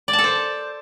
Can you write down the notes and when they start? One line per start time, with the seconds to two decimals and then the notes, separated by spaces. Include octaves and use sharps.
0.08 D5
0.13 A5
0.19 A4
0.24 C5